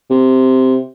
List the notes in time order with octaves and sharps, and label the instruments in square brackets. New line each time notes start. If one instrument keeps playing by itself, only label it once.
[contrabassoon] C3